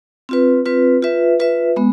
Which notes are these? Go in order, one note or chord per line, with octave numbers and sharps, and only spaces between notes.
C4 F4 B4
C4 F4 B4
F4 B4 E5
F4 B4 E5
G#3 B3